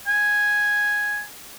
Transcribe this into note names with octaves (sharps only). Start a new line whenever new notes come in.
G#5